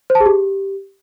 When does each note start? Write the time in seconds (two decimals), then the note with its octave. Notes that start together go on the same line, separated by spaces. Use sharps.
0.10 C5
0.15 A5
0.20 G#4
0.26 G4